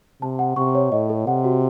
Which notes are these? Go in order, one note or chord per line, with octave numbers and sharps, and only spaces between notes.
C3 A5
F#5
C3 C#6
C#5
A2 D#5
A4
C3 F#5
F#4